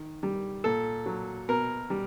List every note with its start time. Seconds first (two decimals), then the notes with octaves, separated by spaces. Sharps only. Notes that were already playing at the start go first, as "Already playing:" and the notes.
Already playing: D#3
0.23 G3
0.64 A#2 A4
1.06 F#3
1.49 B2 A#4
1.90 G3